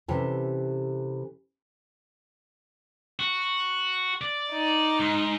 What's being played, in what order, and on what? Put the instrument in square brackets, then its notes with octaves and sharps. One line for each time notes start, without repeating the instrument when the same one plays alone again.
[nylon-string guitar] C3 E3 C#4 G4 A4
[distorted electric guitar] F#4
D5
[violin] D#4
[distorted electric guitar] G#2